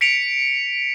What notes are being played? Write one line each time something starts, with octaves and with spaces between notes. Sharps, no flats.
B6 C#7 D7 F7